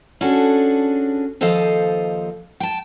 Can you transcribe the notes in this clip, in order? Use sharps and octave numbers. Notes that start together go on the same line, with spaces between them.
C#4 D4 F#4 G#4 A4
D#2 F3 A4 C5 D#5 F5
G5 A5